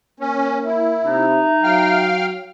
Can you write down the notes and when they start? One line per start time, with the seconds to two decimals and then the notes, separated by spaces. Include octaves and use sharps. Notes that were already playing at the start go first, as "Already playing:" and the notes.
0.20 A#3 C#4
0.65 E4 E5
1.05 C3 D#4
1.63 F#3 F5 G5 F6